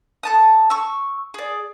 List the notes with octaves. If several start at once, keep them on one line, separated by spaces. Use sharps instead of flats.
A4 A5 D#6
C#6 E6
G#4 D5